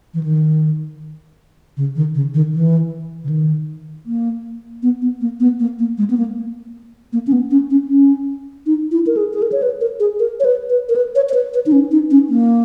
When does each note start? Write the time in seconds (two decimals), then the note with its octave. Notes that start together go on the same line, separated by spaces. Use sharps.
0.14 E3
0.23 D#3
1.77 C#3
1.96 D#3
2.15 C#3
2.34 D#3
2.53 E3
3.24 C#3
3.29 D#3
4.06 A#3
4.83 B3
5.02 B3
5.21 A#3
5.40 B3
5.60 A#3
5.79 A#3
5.98 G#3
6.10 B3
6.17 A#3
7.13 A#3
7.27 C#4
7.32 B3
7.51 C#4
7.70 C#4
7.89 C#4
8.66 D#4
8.92 E4
9.07 A#4
9.17 G#4
9.33 G#4
9.42 A#4
9.52 C#5
9.62 B4
9.81 A#4
10.00 G#4
10.19 A#4
10.40 C#5
10.45 B4
10.70 B4
10.89 A#4
10.96 B4
11.15 C#5
11.29 C#5
11.34 B4
11.54 B4
11.66 D#4
11.72 C#4
11.91 D#4
12.11 C#4
12.29 A#3